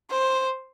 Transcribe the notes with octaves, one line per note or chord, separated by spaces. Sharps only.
C5